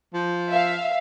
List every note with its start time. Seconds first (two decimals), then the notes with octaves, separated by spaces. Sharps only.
0.14 F3
0.50 E5 F5